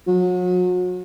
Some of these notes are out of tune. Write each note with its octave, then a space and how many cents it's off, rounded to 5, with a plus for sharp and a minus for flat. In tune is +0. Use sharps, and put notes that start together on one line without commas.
F#3 -35